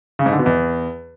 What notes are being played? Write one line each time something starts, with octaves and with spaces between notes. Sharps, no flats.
C#3
G#2
D3
B2
E2